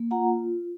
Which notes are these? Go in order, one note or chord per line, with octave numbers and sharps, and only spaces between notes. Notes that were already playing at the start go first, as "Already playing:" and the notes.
Already playing: A#3
F4 F#5 A#5